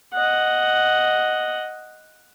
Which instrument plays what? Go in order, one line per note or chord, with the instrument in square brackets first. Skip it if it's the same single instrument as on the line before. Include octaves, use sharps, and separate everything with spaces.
[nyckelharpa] D#5 F#5